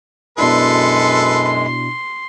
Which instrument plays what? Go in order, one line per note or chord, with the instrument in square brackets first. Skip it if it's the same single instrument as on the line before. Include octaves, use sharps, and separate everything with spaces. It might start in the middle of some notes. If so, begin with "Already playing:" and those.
[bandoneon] F#2 G#3 [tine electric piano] B2 D4 E4 [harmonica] A4 B4 [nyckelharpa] C6